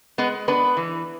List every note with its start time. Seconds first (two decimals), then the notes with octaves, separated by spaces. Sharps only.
0.18 G#3 B3 B4
0.48 B3 D4 B4
0.77 E3